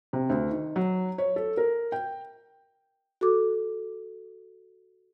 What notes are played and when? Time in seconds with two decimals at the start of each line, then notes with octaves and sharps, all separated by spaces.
0.13 C3
0.29 D2
0.51 D#3
0.76 F#3
1.18 C#5
1.36 A4
1.57 A#4
1.92 G5
3.21 F#4 A4 D6